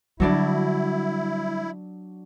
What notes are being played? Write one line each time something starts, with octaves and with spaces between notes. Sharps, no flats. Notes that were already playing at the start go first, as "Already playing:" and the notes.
D3 F#3 G3 D4 E4 D5